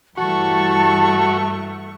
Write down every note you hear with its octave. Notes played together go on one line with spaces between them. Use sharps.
G2 E3 G3 A3 F#4 A5 C#6